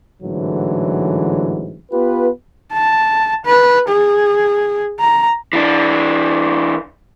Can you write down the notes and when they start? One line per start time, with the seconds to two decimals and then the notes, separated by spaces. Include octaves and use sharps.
0.23 A1 G#2 D3 E3 F#3
1.92 B3 F4 G4 B4
2.73 A5
3.46 B4
3.88 G#4
5.00 A#5
5.53 E3 D4